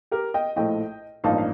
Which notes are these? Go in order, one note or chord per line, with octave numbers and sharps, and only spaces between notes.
G4 A#4
D#5 G5
A#1 A2 F3 A3 D#5 G5
A1 G2 F3 A#3 D#4 F5 A5
F5